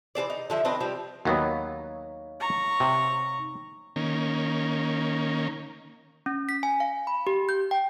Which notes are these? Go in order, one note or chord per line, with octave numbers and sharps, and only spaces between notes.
E3 A3 C5 D5
D#4
D3 F3 E5
C4 D4 B4 D#5
F3 G3 C4
D#2 F#3 B3 D#4 C#5 F5
A#5 C#6
C3
D#3 A#3 C#4
C#4
B6
G#5
F5
B5
G4
G6
G5